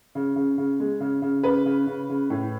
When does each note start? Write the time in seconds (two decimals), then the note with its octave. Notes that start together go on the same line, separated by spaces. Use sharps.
0.15 C#3
0.36 C#3
0.58 C#3
0.80 G#3
1.00 C#3
1.22 C#3
1.43 C#3 B4
1.65 C#3
1.87 C#3
2.09 C#3
2.30 A2